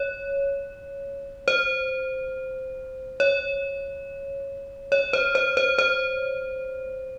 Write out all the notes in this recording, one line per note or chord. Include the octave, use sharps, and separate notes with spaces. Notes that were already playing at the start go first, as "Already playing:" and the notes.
Already playing: C#5
C5
C#5
C#5
C5
C5
C5
C5